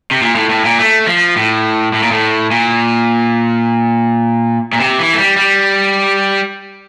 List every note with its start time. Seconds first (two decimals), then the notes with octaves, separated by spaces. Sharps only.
0.11 C3
0.22 A#2
0.36 A2
0.50 A2
0.65 A#2
0.79 A3
1.07 F3
1.36 A2
1.93 A2
2.03 A#2
2.12 A2
2.51 A#2
4.73 A#2
4.80 C3
4.99 E3
5.14 A3
5.18 G3
5.37 G3